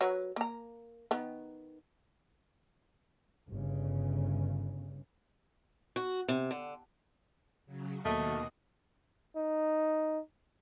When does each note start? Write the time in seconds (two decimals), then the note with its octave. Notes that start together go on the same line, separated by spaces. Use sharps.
0.01 F#3 B4 C#5
0.36 A#3 A#5
1.11 D#3 B3
3.50 G1 C#3
5.96 F#4
6.28 C3
6.51 D3
7.66 C#3 F#3
8.05 D#2 B2 D#3 A3 F#4 D#5
9.36 D#4